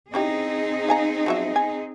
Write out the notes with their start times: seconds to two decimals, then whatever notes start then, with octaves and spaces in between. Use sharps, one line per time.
0.14 C4 C#4 D#4 E4 G4 G#4
0.88 F5 G#5 A#5
1.26 F3 F#3 E5
1.56 G#5